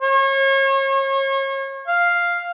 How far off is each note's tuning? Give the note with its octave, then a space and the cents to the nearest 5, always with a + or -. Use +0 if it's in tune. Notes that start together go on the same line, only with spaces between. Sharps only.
C#5 -35
F5 +0